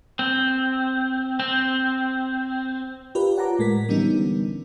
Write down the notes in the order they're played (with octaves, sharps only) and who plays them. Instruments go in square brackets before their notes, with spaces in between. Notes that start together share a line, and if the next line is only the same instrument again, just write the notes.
[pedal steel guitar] C4
C4
[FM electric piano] F4 G4 A#4 B4 D5
C#5 F#5 A5 A#5 D6
A2 G#3 A#4 B6
D3 E3 G3 B3 C#4 D#4